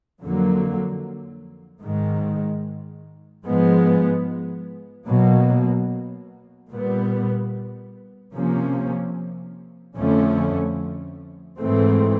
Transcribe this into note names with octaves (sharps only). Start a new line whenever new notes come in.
F2 D3 F#3 A#3
G#2 D#3 G#3
G#2 F3 G#3 B3
B2 F#3 A#3
A#2 G3 B3
C3 F3 A#3 C#4
F2 D3 F3 A3 C#4
G#2 E3 A3 C4